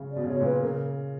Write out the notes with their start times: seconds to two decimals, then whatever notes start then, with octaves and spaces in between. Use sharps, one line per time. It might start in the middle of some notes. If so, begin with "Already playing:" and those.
Already playing: C#3
0.11 D5
0.16 B2
0.24 C#3
0.28 B2 C#5
0.40 A#2 B4
0.62 C#3 A#4